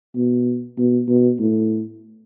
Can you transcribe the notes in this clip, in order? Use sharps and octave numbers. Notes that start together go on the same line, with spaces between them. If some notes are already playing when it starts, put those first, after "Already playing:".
B2
B2
B2
A2